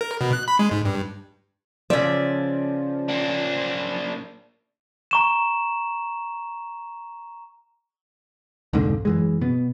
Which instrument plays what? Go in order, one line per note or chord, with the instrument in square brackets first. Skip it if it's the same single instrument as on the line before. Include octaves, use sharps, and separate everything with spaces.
[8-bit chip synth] A#4
B2
F#6
B5
G#3
G#2
G2
[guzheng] C#3 E5 [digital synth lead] F3 [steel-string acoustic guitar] D5
[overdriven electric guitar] A#3 D4
[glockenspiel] A#5 C#6 E7
[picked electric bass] C2 F2 G#2 D3
F#2 E3 G#3
B2 B3